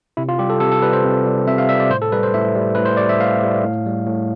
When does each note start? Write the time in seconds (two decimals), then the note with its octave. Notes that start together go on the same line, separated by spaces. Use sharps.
0.17 C3 E4
0.29 F4
0.39 G3 G4
0.50 A4
0.60 C3 A4
0.72 A4
0.82 G3 B4
0.93 C5
1.04 C3
1.26 G3
1.47 C3 E5
1.58 F5
1.69 G3 E5
1.80 D5
1.90 A2 C5
2.02 A4
2.12 G3 B4
2.23 C5
2.34 A2 E5
2.55 G3
2.75 A2 B4
2.85 C5
2.97 G3 D5
3.09 E5
3.20 A2 F5
3.43 G3
3.64 A2
3.86 G3
4.07 A2